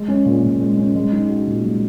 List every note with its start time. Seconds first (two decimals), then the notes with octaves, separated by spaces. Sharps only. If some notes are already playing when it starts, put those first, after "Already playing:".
Already playing: G#3
0.08 C#4
0.26 A#2
0.43 A#2
0.61 G#3
0.78 C#4
0.95 G#3
1.12 D#4
1.30 F#4
1.47 A#2
1.64 G#3